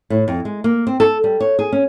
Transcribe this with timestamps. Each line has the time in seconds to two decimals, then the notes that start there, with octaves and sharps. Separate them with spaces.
0.10 A2
0.28 F2
0.45 G#3
0.64 A#3
0.87 C4
1.00 A4
1.24 G3
1.41 C#5
1.59 G#4
1.72 C#4